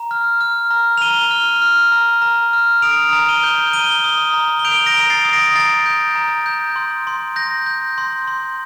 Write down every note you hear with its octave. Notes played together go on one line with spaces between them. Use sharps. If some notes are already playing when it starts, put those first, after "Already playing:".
Already playing: A#5
F6
F6
A#5
F7
A#5 D#7 G7
F6
F6
A#5
A#5
F6
D#6 D7 F7
A#5
D#7 G7
G6
A#5 D#7 G7
D#6
A#5
G7
G6 D7 F7
A#6 D7
A#5
D7
A6 C7
D#6
A#6 D7
A#5 A6 C7
G6
A#5
G6
C6
C6
G6 A#6
G6
C6
C6